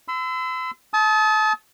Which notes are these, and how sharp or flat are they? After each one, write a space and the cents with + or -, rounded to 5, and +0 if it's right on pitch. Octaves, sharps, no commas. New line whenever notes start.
C6 -45 E6 +0
A5 -25 D#6 +35